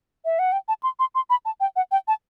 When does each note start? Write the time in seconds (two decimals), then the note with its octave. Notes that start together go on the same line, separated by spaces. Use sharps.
0.25 E5
0.39 F#5
0.52 G5
0.68 A5
0.83 C6
0.99 C6
1.15 C6
1.30 B5
1.45 A5
1.60 G5
1.76 F#5
1.92 G5
2.08 A5